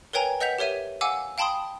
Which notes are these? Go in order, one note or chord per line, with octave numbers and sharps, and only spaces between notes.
A#4 B4 C#5 G5 G#5 A#5
B4 D#5 F#5 G6 B6 F7
G4 A#4 C#5 E5 D#7
F5 F#5 G#5 D6 E6
F5 G5 A5 B5 C6 D#6